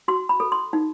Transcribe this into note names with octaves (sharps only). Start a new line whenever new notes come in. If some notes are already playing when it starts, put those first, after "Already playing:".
F#4 C6
B5
A4
C6
D#4